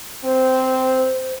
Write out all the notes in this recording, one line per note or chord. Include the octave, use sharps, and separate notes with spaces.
C4 C5